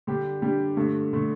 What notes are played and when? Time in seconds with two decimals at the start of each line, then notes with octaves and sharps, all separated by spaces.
0.07 D3 G3 D4 G4
0.42 D3 G3 D4 G4
0.77 G2 D3 A3
1.13 D3 A3